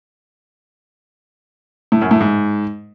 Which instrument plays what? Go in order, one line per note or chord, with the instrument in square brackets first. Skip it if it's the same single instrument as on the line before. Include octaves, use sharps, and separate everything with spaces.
[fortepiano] A2
F#2
A2
G#2